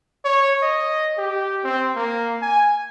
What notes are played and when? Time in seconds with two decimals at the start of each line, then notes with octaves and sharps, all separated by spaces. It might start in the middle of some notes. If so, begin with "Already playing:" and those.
0.25 C#5
0.62 D#5
1.18 G4
1.64 C4
1.95 A#3
2.42 G#5